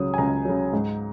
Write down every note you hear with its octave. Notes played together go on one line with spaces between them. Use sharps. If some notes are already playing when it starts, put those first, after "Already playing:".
Already playing: C#2 C#3 F#3 D#6
G#5
C#2 A#5
C#3 F#3
G#2